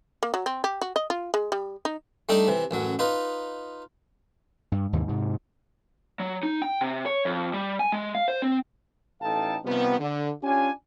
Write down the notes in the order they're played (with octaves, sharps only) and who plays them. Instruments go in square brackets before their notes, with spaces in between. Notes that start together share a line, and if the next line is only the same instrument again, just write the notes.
[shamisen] A#3
F#3
C4
G4
F#4
D#5
F4
G#3
G3
D#4
[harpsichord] G3 A3 D4 D#4 G4 A4
C3 E3
A1 F#2 F#3
D#4 F4 B4
[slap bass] G2
D#2 G#2 C3 E3
G#2 C3
[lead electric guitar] F#3
D#4
G5
C3
C#5
F2
G3
G#5
G#3
F5
C5
C4
[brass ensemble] A1 D#4 A4 F5 G5 A5
C3 D#3 F3 G3 B3
D3
C#4 D4 F4 G4 G#5